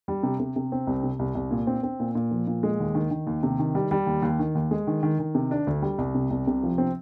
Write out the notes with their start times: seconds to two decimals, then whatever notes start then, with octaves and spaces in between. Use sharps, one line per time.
0.08 G3
0.23 C3
0.40 C3
0.56 C3
0.72 C4
0.87 C2
1.03 C3
1.19 C2
1.35 C2
1.51 A#2
1.67 C4
1.83 C4
2.00 A#2
2.15 A#2
2.31 F3
2.47 A#2
2.63 G#3
2.80 D#2
2.95 D#3
3.11 D#3
3.27 D#2
3.43 C3
3.59 D#3
3.75 G3
3.91 G3
4.07 D#2
4.22 D#2
4.39 D#3
4.55 D#2
4.71 G#3
4.87 D#3
5.03 D#3
5.19 D#3
5.35 C3
5.51 D4
5.67 D2
5.82 G3
5.98 C2
6.15 C3
6.30 C2
6.47 C3
6.63 F3
6.78 C4